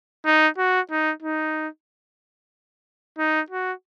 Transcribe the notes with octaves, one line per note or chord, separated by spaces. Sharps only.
D#4
F#4
D#4
D#4
D#4
F#4